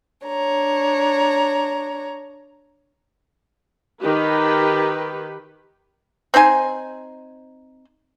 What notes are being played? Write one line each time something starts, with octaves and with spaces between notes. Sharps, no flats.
D4 C#5 A#5
D#3 G4 B4
C4 D#4 C5 G#5